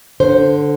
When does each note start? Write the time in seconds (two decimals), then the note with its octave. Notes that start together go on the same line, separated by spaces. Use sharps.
0.20 D3 C5